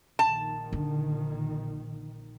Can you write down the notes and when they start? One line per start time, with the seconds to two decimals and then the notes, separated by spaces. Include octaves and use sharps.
0.19 A#1 D#3 A5
0.73 D3